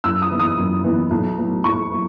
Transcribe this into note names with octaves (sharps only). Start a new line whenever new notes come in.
F#2 E6
D#6
E3 B3 D#4
D#6
F#2
E3 B3 D#4
B1
A2 F#3 B3
B1 C#6
F#3 B3